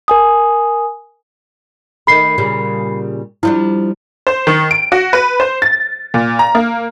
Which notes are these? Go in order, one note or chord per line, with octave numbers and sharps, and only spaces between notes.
A#4 G#5 D#6
D#3 A3 B5 C7
A#2 C#3 G3
F3 G3 D4 E4
C5
D#3
D7
F#4
B4
C5
A6
A#2
A#5
A#3